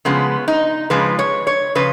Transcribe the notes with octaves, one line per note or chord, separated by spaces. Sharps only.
C#3 F3 G#3 B3
D#4
C#3 F3 G#3 B4
C#5
C#5
C#3 F3 B4